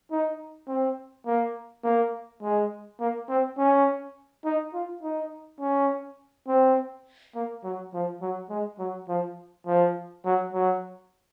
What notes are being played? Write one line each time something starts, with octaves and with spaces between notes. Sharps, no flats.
D#4
C4
A#3
A#3
G#3
A#3
C4
C#4
D#4
F4
D#4
C#4
C4
A#3
F#3
F3
F#3
G#3
F#3
F3
F3
F#3
F#3